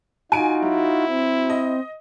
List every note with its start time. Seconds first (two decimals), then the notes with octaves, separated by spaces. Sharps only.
0.32 D#4 F4 F#4 G#5 D7
0.62 F#3 E4
1.07 C4
1.50 D#5